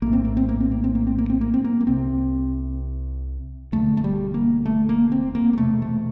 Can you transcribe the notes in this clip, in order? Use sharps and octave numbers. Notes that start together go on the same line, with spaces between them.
A#1 A2 A#3
C4
A#3
C4
A#3
C4
A#3
C4
A#3
C4
A#3
C4
A#3
C4
A#3
A#3
C2 C3 C4
E1 D2 D3 A3
A3
G3
A#3
A3
A#3
C4
A#3
A#3
E1 E2 C3 A3
A3